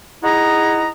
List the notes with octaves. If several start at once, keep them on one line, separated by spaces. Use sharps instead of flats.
D#4 E4 G#4 D#5 F#5 A#5